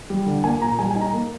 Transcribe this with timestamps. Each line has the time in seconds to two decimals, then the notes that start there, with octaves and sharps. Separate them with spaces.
0.10 G3
0.26 D3
0.44 A#3 G#5
0.62 A#2 A#5
0.79 G3 G#5
0.91 D#4 G#5
1.01 A#5
1.13 A#3